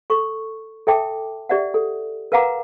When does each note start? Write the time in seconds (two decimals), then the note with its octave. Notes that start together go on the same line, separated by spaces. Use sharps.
0.10 A4 C#6
0.87 A4 E5 G5 A5 D6
1.49 G4 D5 E5 F#5
1.74 A4
2.32 A#4 B4 F5 F#5 A#5 D6